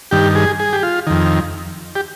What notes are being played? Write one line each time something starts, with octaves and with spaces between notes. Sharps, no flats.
G2 D#3 G4
G#4
G#4
G4
F4
F2 D#3
G4